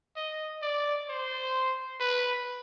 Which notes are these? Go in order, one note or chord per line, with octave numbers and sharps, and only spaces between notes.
D#5
D5
C5
B4